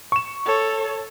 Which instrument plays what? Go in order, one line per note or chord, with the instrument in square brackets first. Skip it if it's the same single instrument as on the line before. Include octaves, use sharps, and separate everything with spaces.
[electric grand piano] C#6 E7
[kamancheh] A4 C#5